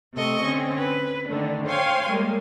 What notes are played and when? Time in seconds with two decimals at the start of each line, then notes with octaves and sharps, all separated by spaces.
0.13 C3 A3 A4 D#5 C#6
0.43 D3 C4 C#4
0.77 B4
1.29 D3 D#3 A3 D4
1.65 C5 C#5 F5 G5 G#5 C6
2.08 G3 G#3 A#3